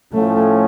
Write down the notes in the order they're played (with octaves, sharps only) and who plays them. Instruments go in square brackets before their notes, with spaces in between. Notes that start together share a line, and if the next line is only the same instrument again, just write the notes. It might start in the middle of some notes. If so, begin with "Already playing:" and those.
[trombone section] A2 F3 C#4 [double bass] A3